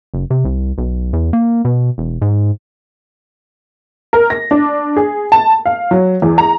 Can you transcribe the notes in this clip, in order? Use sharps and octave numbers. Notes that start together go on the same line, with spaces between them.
F#1
C3
C2
B1
E2
A#3
B2
E1
G#2
A#4
A#6
D4
G#4
A5
F5
F#3
E2
A#5